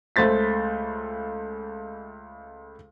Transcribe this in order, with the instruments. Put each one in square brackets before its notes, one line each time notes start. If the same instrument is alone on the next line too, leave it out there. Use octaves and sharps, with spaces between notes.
[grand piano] C#2 A3 C5 A6 B6